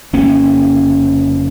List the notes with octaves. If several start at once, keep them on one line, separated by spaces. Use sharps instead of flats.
F1 F2 C#3 A#3 C#4